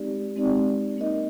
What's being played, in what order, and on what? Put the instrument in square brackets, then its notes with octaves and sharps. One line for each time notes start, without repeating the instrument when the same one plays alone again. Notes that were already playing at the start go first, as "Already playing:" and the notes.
Already playing: [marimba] G#3 C4 D#4 G4 D5
G#3 C4 D#4 G4 D5
A#3 D#4 A#4 D#5